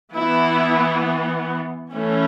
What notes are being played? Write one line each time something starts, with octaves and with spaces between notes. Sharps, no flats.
E3 B3 E4
E3 A3 C#4